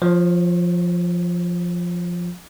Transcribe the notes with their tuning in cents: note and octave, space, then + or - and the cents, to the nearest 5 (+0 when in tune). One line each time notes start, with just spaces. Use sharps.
F3 +0 C#5 -35